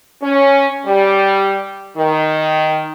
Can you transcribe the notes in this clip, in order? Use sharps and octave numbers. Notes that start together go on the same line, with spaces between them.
C#4
G3
D#3